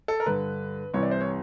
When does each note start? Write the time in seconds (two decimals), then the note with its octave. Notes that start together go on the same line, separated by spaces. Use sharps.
0.08 A4
0.20 A#4
0.26 G2 D3 B4
0.94 C2 C3 E3 C#5
1.02 D5
1.11 C5
1.21 C#5